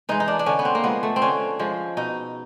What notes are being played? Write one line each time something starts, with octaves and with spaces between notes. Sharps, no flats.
E3 G#3 D#4
D#4
D4
D4
D3 C#4
B3
C4
A#3
F3 G#3 B3
A3
C4
D3 C#4
F3 G#3
B2 D#4